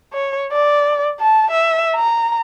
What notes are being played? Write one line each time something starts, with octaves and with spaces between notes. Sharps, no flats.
C#5
D5
A5
E5
A#5